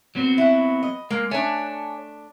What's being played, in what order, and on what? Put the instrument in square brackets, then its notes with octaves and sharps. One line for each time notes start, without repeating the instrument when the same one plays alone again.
[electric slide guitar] F#3 B3 C4
[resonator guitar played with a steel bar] E4 F#4
D#5
[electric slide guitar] G#3 [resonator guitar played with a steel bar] A#3
[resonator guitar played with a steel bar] A3 D4 [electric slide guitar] C#5 G#5